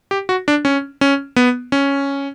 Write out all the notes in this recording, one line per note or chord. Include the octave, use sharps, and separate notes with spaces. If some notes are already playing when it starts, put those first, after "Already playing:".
G4
F#4
D4
C#4
C#4
B3
C#4